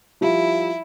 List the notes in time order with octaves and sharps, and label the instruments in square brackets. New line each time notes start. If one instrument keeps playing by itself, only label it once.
[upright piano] F3 G3 F4 [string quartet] E4